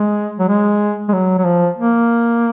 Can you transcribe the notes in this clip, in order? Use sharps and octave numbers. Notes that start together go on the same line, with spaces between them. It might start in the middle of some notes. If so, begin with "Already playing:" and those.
Already playing: G#3
F#3
G#3
G#3
F#3
F#3
F3
A#3